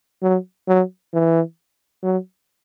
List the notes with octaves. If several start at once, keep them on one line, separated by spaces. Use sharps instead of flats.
F#3
F#3
E3
F#3